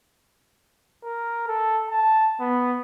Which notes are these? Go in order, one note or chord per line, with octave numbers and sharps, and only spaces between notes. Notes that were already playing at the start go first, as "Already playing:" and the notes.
A#4
A4
A5
B3